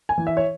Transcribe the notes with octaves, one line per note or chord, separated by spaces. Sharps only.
G#5
E3
E5
C#5